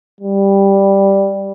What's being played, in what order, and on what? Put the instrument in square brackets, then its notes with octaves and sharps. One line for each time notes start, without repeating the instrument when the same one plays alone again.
[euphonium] G3